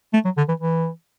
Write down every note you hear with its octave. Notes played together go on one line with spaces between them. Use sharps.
A3
F#3
D3
E3
E3